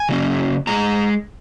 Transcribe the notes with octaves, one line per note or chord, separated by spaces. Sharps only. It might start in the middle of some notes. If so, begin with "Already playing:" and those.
Already playing: G#5
C#3 F#3 A#3 C#4
A#2 G#3 A#5